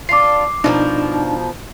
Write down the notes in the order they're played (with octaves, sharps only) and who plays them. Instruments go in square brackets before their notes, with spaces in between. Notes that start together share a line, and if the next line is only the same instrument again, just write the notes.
[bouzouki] D4 F4 [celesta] D6 C7
[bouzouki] B2 F3 A#4 [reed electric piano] D4 D#4 D5